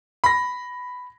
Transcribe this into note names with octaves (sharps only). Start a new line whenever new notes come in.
B5 A#6